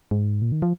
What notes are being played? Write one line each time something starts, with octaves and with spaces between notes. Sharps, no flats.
G#2
A#2
D#3
F3